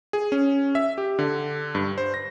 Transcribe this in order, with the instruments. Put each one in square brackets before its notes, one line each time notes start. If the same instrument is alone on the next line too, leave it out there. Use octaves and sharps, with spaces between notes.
[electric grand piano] G#4
C#4
E5
G4
D3
G2
C5
A#6